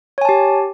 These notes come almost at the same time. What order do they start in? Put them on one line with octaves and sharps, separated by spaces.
C#5 G#5 A5 G4